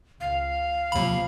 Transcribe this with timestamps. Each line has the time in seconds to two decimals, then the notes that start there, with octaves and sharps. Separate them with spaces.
0.21 C#2 F5
0.92 D#2 C3 F3 B5